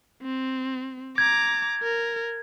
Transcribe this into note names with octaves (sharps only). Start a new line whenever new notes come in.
C4
A#5 D6 G#6
A#4